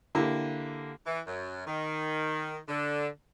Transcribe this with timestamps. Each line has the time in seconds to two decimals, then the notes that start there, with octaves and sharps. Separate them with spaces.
0.15 D3 A#3 E4 G4
1.06 E3
1.27 F#2
1.66 D#3
2.68 D3